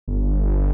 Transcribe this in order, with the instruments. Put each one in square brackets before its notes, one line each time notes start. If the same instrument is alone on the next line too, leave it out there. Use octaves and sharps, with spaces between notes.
[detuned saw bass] G1